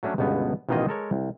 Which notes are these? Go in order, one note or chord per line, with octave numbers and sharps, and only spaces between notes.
F#3 A3 C#4 D4
G1 C#2 B2 B3
A1 B2 D#3 A#3 F4 D#5
G#3 A4 A#4 C#5
C2